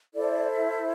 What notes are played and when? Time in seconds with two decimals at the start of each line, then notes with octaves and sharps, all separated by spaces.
0.13 E4 A4 C5 D5
0.50 E5